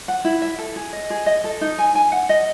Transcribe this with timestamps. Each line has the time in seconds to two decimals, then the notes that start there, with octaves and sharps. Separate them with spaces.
0.08 F#5
0.25 E4
0.42 E5
0.58 A4
0.76 G#4
0.93 D#5
1.10 G#4
1.26 D#5
1.44 A4
1.61 D#4
1.78 G#5
1.95 G#5
2.12 F#5
2.29 D#5